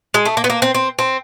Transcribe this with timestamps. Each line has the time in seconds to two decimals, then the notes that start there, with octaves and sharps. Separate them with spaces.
0.14 G#3
0.25 A3
0.37 A#3
0.44 B3
0.50 A#3
0.62 C4
0.75 C4
0.99 C4